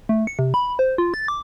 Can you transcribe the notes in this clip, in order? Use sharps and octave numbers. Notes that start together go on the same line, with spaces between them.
A3
C#7
C3
B5
C5
F4
A6
D6